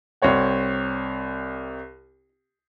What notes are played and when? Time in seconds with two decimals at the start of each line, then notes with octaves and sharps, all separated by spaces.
0.22 C2 C4 C#5 F#5